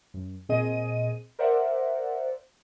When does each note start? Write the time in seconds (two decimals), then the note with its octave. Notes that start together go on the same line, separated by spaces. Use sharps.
0.14 F#2
0.49 A#2 C4 G#4 D#5 D#7
1.39 A#4 C5 D5 E5 F#5